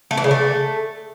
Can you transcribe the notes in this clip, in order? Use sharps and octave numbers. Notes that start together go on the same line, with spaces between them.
A3
E3
C#3
A3